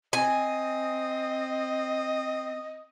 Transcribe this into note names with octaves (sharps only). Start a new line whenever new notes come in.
C4 D#5 G#5